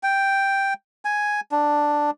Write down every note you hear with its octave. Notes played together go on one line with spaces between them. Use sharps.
G5
G#5
D4